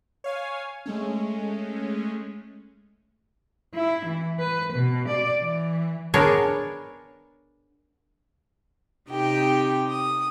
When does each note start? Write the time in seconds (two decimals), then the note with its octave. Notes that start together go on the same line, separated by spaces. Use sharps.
0.24 C#5 F5 G#5
0.86 G#3 A3 C#4
3.75 E4
4.06 E3
4.40 B4
4.74 B2
5.09 D5
5.42 E3
6.14 B3 D4 G#4 A#4 C#5
9.10 C3 D#4 G4 G5
9.89 D#6